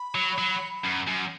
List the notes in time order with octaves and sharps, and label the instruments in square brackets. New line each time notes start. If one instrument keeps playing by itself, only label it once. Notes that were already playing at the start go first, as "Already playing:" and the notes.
Already playing: [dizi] B5
[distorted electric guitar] F#3
F#3
F#2
F#2